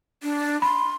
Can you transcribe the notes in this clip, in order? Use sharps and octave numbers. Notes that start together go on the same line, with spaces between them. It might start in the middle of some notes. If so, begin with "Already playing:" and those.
D4
B5 C6